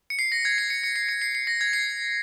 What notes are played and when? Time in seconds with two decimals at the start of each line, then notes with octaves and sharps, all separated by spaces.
0.10 C#7
0.19 C7
0.32 A#6
0.45 G#6
0.58 C7
0.70 C#7
0.84 C#7
0.96 C7
1.09 C#7
1.22 C7
1.35 C7
1.47 A#6
1.61 G#6
1.73 C7